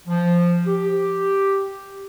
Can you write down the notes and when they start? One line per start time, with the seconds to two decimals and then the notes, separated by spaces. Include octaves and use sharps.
0.07 F3
0.67 G4